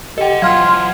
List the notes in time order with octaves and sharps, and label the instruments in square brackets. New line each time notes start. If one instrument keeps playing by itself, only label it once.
[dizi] G4 [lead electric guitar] A4 F#5 [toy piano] D#5 G5
[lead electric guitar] F#3 F4 [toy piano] F5 [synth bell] F#5 F6 G#6 [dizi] C6